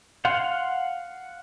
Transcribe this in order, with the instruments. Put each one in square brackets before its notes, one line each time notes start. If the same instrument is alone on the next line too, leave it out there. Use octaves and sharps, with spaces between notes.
[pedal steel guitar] F5 F#5 C6